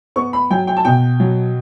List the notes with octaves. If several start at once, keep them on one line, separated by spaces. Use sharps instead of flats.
B3 C#6
B5
F#3 G5
G5
A5
B2 G5
F#3